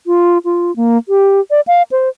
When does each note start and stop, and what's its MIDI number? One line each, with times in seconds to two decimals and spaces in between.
0.07 0.38 65
0.45 0.74 65
0.76 0.98 58
1.09 1.40 67
1.51 1.61 74
1.67 1.83 77
1.92 2.09 72